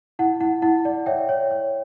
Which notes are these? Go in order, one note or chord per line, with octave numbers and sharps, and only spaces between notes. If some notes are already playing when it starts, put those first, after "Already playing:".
E4 F#5
E4 F#5
E4 F#5
D5
C#5 E5 G5
C#5
C#5